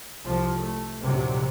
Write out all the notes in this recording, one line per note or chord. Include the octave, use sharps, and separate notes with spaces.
C2 F3
A3
A#1 D#2 C3 F#3 G3